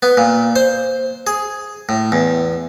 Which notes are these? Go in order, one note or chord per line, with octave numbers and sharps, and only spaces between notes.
B3
A#2
C5
G#4
A2
E2